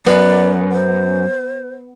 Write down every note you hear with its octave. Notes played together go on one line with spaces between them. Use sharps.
F#2 B3 D5
C5